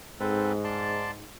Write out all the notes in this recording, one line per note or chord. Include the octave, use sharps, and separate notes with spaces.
G#2 C4 A4 B4
D5 A5 C6